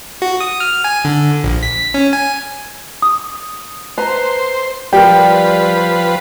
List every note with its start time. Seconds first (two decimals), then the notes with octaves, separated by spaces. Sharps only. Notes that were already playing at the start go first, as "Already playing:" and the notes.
0.22 F#4
0.40 D#6
0.60 F6
0.84 G#5
1.04 D3
1.44 A#1
1.63 B6
1.94 C#4
2.13 G#5
3.02 D#6
3.98 B4 C5 A#5
4.93 F3 G3 G4 A#4 B4 G5